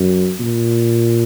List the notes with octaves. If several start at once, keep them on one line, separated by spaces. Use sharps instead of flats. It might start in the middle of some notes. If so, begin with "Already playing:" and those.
Already playing: F#2
A#2